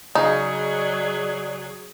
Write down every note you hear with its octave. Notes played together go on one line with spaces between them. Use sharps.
C#3 F#3 D#4 G#4 D5